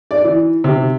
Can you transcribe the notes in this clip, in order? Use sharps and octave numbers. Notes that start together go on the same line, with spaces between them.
D5
E3
C3